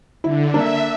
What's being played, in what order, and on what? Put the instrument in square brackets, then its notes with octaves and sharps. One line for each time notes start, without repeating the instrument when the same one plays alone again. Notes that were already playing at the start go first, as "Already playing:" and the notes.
[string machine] D3 [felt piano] E4
[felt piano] A#3 D4 [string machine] E5